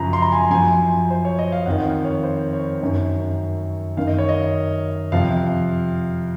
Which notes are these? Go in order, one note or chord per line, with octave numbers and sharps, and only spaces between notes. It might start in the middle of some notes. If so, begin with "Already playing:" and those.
Already playing: F#2 C#3 F3 A#5
C6
A#5
G#5
F#2 F3 G#5
C5
C#5
D#5
F5
F2 D#3 F#5
F5
C#5
C5
C#5
F#2 D#3
F#2 D#3 F5
D#5
C#5
D#5
F2 C3 F3 F5